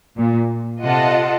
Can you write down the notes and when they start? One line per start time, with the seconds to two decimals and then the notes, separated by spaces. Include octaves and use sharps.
0.17 A#2
0.84 C3 F4 A4 D#5 F#5 A5